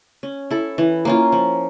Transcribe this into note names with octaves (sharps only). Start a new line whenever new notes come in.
C#4
E4 A4
E3
A#3 C#4 F4
F3